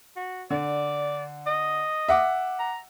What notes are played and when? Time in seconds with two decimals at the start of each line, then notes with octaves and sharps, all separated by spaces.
0.16 F#4
0.51 D3 D5
1.46 D#5
2.08 E5 F#5 D6
2.59 A#5